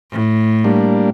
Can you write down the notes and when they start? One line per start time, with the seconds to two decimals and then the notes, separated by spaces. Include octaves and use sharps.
0.11 A2
0.64 G3 A#3 D4